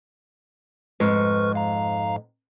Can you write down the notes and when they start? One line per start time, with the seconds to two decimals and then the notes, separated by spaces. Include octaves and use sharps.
1.00 F2 G#2 B4 C#6 F6
1.55 F5 A#5